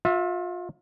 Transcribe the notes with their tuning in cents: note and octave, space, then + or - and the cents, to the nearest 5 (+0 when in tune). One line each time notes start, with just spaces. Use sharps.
F4 +30 E5 -5